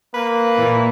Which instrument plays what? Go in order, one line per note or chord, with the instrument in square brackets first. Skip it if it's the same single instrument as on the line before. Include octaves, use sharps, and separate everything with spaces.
[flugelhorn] A#3 [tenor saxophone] B4
[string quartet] A#2 E3